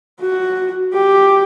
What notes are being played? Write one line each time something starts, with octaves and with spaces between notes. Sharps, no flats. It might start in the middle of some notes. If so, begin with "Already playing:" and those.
F#4
G4